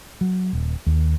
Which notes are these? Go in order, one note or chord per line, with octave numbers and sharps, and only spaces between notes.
F#3
D#1
D#2